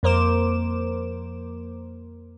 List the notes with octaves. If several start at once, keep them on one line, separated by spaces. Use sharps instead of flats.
F2 A#3 A#4 C5 D6 E7